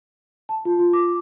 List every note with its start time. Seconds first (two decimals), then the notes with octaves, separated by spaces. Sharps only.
0.49 A5
0.65 F4
0.79 F4
0.93 D6